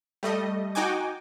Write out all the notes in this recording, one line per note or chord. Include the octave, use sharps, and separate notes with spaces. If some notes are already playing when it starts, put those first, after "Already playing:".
G3 A3 D#5
D#4 F#4 G5 G#5 D6